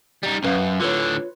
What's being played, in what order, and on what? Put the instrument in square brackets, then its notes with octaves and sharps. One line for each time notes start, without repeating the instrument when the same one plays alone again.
[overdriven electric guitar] G3 D#4
[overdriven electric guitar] C2 F#2 [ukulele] C#4 B4 F5
[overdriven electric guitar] A2 D3 [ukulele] F4 B4 C#5